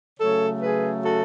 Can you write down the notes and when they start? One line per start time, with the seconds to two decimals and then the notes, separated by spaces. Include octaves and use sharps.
0.20 C#3 F#3 A3 A4 C#5
0.61 G#4 B4
1.03 F#4 A4